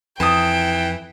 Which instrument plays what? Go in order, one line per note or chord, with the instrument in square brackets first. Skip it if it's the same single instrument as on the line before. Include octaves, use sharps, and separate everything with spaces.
[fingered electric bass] F2 [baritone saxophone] E3 [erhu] G5 [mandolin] A5 D#6